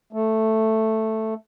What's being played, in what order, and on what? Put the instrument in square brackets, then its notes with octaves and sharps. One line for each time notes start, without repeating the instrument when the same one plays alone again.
[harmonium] A3